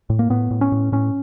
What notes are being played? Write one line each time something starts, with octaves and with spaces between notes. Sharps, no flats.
A2
A#3
A2 B3
A2
C#4
A2
A2 C#4